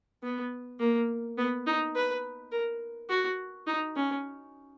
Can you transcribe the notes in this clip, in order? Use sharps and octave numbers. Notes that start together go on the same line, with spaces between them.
B3
A#3
B3
D#4
B4
A#4
F#4
D#4
C#4